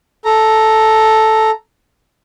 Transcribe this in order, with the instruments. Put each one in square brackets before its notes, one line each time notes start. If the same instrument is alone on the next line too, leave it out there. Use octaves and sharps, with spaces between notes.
[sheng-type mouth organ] A4 A#5